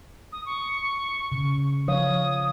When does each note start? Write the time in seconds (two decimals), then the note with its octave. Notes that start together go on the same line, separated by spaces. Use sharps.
0.32 D#6
0.46 C#6
1.32 C#3
1.88 F3 C#5 F5 D#6